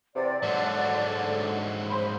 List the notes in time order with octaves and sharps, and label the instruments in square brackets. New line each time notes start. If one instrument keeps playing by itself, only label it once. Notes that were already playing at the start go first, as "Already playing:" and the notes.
[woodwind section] E2 C3 [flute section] D5
[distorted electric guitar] G#2 F#3 [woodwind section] D3
[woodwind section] C5 B5